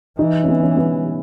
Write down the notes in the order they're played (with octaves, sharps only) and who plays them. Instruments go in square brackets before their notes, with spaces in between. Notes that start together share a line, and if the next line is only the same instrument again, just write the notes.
[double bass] E3 [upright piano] D#4
[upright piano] C#4
B3
C#4
B3